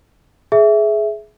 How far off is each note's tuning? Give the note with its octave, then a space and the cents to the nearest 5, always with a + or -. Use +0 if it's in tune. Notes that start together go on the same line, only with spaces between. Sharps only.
G#4 +20 E5 +0